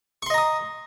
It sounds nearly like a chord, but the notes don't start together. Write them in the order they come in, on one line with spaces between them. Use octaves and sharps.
C#6 C6 D#5 A#5 D#6